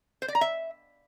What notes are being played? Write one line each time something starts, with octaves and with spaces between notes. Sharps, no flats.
C5
D5
A#5
E5